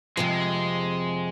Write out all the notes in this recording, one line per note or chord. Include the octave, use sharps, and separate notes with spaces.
F2 C3 F3 G#3